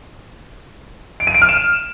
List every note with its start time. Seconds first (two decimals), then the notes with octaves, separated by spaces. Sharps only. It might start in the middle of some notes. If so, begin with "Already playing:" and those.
1.20 D7
1.27 D#7
1.34 D7
1.42 F6
1.49 E7